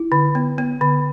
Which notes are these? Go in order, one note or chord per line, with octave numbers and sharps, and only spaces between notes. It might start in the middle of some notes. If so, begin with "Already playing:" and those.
Already playing: E4
D3
B3
B3
D3